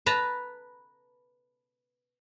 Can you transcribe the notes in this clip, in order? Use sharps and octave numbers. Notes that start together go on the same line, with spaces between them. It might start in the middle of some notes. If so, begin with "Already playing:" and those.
B4 A5 A#5